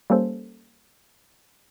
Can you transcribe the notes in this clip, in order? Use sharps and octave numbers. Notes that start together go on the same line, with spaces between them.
G3 A#3 C#4 A4 C5